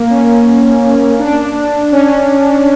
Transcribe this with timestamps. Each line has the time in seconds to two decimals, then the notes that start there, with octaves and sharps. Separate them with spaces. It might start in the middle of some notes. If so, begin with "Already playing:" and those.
Already playing: A#3
0.10 C#4
1.19 D4
1.92 C#4